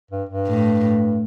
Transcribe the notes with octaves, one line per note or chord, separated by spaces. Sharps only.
G2
G2
A2